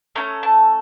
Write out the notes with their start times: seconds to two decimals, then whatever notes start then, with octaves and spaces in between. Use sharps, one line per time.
0.15 A3 C#4 A4 A#5
0.43 A5